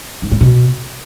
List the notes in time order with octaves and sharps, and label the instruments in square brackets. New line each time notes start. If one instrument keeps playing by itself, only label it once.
[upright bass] G#2
A2
B2